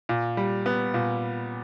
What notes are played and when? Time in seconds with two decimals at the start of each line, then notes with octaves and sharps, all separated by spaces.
0.09 A#2
0.37 G3
0.66 B3
0.94 A#2